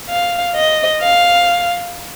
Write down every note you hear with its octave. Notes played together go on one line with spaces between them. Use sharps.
F5
D#5
F5